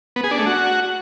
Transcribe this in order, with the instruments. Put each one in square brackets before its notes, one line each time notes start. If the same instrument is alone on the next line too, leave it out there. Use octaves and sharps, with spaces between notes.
[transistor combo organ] B3
G#4
D4
A3
F#4